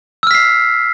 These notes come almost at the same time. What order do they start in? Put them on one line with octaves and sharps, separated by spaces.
E6 F6 B6 C7